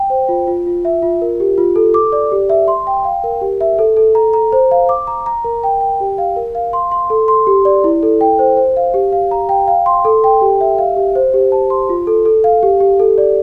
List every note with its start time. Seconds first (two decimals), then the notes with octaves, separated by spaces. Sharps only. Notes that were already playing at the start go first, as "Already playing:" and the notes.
Already playing: G5
0.10 C5
0.29 F4
0.47 F4
0.66 F4
0.85 E5
1.02 F4
1.22 A#4
1.40 G4
1.58 F4
1.76 A4
1.94 D6
2.12 D5
2.32 G4
2.49 E5
2.68 C6
2.87 G5
3.05 F5
3.24 A#4
3.41 G4
3.61 E5
3.79 A4
3.97 A4
4.15 A#5
4.33 A#5
4.52 C5
4.71 F5
4.89 D6
5.07 A#5
5.26 A#5
5.45 A#4
5.63 G5
5.81 G5
6.00 G4
6.18 F5
6.36 A#4
6.55 F5
6.73 C6
6.92 C6
7.10 A4
7.28 C6
7.47 G4
7.65 D5
7.84 E4
8.03 A4
8.21 G5
8.39 C5
8.57 C5
8.77 F5
8.94 G4
9.13 F5
9.31 A#5
9.49 G5
9.68 F5
9.86 C6
10.05 A4
10.24 G5
10.41 G4
10.61 E5
10.78 F5
10.96 G4
11.15 C5
11.34 G4
11.52 A5
11.70 C6
11.89 F4
12.07 A4
12.25 A4
12.44 F5
12.63 G4
12.80 G4
13.00 A4
13.18 D5